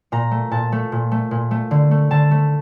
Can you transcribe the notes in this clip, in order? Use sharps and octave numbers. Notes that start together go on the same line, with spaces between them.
A#2 A#5
A3
A#2 A5
A3
A#2
A3
A#2
A3
D3
A3
D3 A5
A3